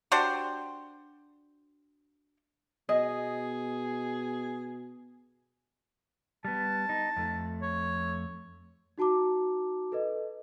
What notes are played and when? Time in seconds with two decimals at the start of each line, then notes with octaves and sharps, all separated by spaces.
0.12 D4 F#4 G4 C5
2.89 B2 G#4 D#5
6.45 G3 B3 A5
6.89 D#4
7.17 F2 A3
7.62 C#5
8.98 D#4 F#4 A5 A#5 D6
9.92 A4 B4 D#5